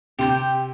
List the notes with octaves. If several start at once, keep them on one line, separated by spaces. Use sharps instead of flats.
C3 G4 C5 G5